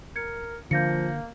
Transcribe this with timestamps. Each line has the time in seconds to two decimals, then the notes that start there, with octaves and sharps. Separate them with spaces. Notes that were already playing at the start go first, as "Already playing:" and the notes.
0.16 A#4 G#6 C#7
0.71 D3 F3 A#3 G6 A#6 C#7